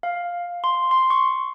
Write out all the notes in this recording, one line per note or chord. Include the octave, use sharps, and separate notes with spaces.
F5
C6
C6
C#6